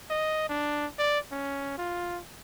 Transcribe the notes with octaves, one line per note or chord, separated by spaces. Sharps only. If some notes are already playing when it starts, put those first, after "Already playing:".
D#5
D4
D5
C#4
F4